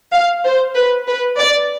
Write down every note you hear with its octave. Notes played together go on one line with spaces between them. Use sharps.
F5
C5
B4
B4
D5